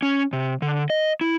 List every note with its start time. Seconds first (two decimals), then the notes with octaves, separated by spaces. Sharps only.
0.02 C#4
0.33 C3
0.62 D3
0.90 D#5
1.21 E4